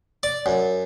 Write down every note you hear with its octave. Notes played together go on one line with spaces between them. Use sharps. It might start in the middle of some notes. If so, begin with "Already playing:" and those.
D5
F#2